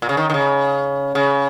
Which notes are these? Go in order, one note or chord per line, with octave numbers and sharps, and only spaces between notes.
A#2
C#3
D#3
D#3
C#3
C#3